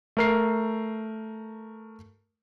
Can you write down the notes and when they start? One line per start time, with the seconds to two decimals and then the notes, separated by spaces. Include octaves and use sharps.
0.17 A3 A#4 C7